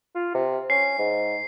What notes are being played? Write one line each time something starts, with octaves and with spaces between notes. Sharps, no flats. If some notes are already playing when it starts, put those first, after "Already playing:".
F4
C3
C#4 C7
G#2